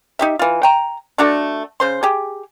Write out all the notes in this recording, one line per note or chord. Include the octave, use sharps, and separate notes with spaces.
D#4 G4 E5
E3 F4
G5 A#5
A3 D4 F#4 A4
C#3 C5 C6
G4 G#4